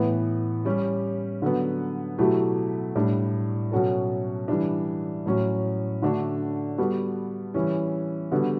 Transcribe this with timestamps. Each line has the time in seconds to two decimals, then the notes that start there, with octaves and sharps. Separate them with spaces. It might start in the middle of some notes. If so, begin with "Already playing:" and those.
Already playing: A2 E3 B3
0.65 G3 C#4 G4
1.42 D3 F#3 B3
2.18 B2 F#3 A3 E4 G4
2.95 A2 G3 D4
3.71 B2 F#3 C#4 F#4 A4
4.48 E3 G3 D4
5.26 A2 F#3 C#4
6.02 D3 A3 D4 F#4
6.78 G3 B3 F#4 A4
7.54 E3 G3 C#4
8.32 D3 G3 B3 F#4